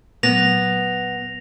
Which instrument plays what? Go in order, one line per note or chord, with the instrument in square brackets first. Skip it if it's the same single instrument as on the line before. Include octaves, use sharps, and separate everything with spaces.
[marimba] A#2 F#3 [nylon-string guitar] B3 [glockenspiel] A#6 F7